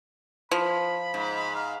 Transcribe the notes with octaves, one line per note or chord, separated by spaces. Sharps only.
F3 B5
G#2
F5